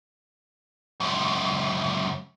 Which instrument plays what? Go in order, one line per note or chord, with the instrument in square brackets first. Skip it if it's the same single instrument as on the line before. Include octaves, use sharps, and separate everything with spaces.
[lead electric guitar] C#2 F#2